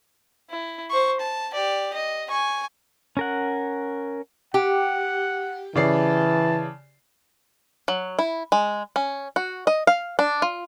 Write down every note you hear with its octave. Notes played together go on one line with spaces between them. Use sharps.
E4
C5 C#6
A5
G4 D5
D#5
G#5 C#6
C#4 A#4 F#5
G4 F#5
C#3 E3 D5 A5 C7
F#3
E4
G#3
C#4
F#4
D#5
F5
D4
F4